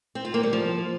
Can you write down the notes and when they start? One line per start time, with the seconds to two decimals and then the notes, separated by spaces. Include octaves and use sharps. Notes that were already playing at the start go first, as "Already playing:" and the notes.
0.15 C4
0.25 F4
0.34 A#3
0.43 G3
0.53 F3